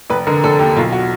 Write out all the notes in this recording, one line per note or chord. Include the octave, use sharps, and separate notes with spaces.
F1 B4
D3 A#4
F1 A4
D#2 G4
B1 F4
F#4